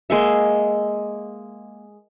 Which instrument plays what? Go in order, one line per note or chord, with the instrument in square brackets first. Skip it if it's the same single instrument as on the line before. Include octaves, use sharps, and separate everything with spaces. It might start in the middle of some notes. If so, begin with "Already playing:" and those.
[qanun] G#3 A#3 E5